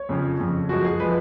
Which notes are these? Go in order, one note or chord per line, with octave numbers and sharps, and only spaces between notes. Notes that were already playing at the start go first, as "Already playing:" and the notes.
Already playing: C#5
F2 C#3 F3
F2 C#3 F3
F#2 F3 G#3 F#4
G#4
F3 G#3 B4